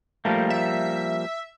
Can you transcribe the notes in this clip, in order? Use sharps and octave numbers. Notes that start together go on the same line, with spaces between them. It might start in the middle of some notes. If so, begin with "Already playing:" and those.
F3 G3 A3 A#3
E5